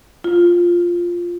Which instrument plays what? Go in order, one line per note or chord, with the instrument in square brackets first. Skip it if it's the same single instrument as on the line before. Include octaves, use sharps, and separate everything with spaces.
[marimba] F4